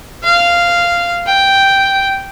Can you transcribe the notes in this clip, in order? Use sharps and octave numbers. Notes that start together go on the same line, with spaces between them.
F5
G5